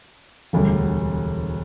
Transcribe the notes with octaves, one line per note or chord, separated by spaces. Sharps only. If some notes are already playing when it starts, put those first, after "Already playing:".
E1 D2 D3 G3